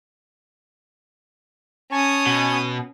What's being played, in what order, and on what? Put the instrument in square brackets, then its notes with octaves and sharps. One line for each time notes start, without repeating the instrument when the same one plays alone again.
[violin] C#4 D#6 [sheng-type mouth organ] G#5 A5 C#6
[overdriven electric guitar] B2